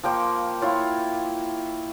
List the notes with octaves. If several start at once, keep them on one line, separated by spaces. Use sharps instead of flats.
F3 A#3 G5 C6
E4 F4 C#5